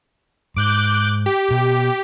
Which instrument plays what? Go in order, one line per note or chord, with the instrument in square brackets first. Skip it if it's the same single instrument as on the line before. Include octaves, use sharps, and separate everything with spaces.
[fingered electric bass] G#2 [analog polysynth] D6 F#6 G6
[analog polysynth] G4
[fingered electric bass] B2